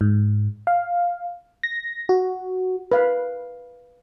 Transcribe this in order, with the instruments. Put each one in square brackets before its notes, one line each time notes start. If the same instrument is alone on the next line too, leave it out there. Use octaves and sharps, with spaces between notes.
[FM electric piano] G#2
F5
A#6
F#4
[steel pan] B4 F5